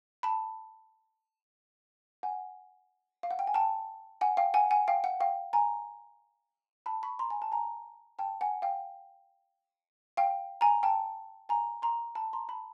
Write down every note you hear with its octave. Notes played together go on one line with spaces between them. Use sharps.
A5 B5
F#5 G#5
F5
F#5
G5
G#5
G5 A5
F#5 G#5
F5 G5
F#5 G#5
F#5 G#5
F5 G5
F#5
F5 G5
G#5 A#5
A5 B5
B5 C#6
A#5 C6
G#5
A5
G#5 A#5
G5 A5
F#5 G#5
F5 G5
F5 G5
G#5 A#5
G5 A5
G#5 A#5
A#5 C6
A5 B5
A#5 C6
A5 B5